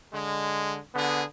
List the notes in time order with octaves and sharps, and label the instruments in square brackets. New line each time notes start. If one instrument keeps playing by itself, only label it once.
[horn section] D3 G#3
D3 B3 G#4